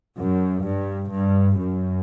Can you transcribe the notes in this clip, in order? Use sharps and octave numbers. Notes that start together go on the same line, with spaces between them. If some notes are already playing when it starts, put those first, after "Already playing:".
F#2
G2
G2
F#2